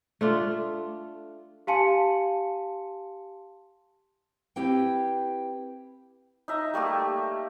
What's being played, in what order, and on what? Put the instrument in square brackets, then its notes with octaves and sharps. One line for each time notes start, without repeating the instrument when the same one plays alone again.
[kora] A3 D4 F4
[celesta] G4 F5 G#5 A5 C6 C#7
[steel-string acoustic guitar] C4 E4 G4 B4 F5 G5
[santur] D#4 E5 A#5
G3 A3 A#3 G4